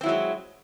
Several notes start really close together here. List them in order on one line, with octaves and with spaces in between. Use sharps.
C4 E4 F#3 G#3